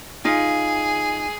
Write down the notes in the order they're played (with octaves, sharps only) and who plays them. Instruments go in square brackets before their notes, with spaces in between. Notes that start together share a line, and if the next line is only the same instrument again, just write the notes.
[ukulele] D#4 F4 [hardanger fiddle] G#4